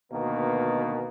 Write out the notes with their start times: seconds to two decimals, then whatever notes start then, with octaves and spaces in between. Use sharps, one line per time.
0.12 D2 B2 D#3 A#3 B3